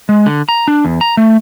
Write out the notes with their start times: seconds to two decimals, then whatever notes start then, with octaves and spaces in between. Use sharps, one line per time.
0.09 G#3
0.26 D3
0.49 A#5
0.68 D4
0.85 E2
1.01 A#5
1.17 A3